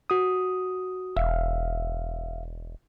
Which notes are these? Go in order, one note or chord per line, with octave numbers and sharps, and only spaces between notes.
F#4 D#6
E1 E5 F5